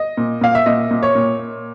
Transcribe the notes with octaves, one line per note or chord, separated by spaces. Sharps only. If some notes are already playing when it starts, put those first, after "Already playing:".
Already playing: D#5
A#2
A#2 F5
E5
A#2 D#5
A#2
C#5
A#2